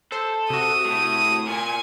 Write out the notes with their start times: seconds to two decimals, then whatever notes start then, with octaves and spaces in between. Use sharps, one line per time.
0.12 A4 C5
0.50 C3 F#4 D#6
0.86 A2
1.47 A#2 G#5